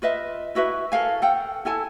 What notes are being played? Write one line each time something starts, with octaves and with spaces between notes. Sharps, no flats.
F4 B4 D#5 E5
E4 F#4 B4 E5
A4 A#4 F5 G#5
A4 F#5 G5
E4 A4 G#5 A5